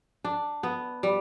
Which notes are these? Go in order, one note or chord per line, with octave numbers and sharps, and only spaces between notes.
D4
B3
G3